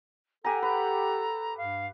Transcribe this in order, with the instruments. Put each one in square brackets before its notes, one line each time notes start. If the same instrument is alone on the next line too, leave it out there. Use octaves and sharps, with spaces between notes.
[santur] G4 F#5 A#5 [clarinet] A4 [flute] G#5
[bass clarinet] G4 [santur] B4 [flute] A#5
[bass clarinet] G2 [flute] F5